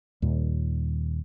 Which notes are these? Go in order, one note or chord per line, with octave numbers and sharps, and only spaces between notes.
D#2 A#2 G3